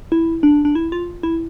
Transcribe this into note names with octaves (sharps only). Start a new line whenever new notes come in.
E4
D4
D4
E4
F4
E4